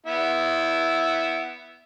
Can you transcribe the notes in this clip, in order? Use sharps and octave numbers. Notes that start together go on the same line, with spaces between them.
B3 E4